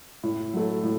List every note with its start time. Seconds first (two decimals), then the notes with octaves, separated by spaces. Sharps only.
0.23 A2
0.53 F#3 A3
0.83 A2